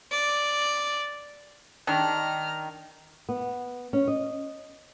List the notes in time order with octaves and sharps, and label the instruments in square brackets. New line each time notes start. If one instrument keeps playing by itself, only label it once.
[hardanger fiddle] D5
[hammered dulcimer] D#3 [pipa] D4 [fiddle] A#5 F6
[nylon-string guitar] B3
C#4
D#5